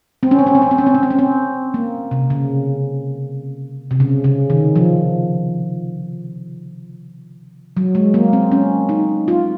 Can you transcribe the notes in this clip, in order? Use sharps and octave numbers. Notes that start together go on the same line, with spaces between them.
C4
C#4
C4
C#4
C4
C#4
C4
C#4
C4
C#4
C4
C#4
C4
A#3
C3
C#3
C3
C#3
C#3
D#3
F3
F#3
G#3
A#3
C4
C#4
D#4
F4